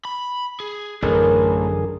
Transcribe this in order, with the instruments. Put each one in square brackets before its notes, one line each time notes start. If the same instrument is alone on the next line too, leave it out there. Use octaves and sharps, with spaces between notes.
[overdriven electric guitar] B5
G#4
[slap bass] A1 [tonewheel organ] F#2 D3 G#4 [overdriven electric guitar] E3 [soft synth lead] A#4